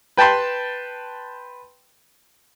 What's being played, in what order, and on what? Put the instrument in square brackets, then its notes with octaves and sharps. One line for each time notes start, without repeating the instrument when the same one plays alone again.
[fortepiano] B4 G5 A5 B5 C6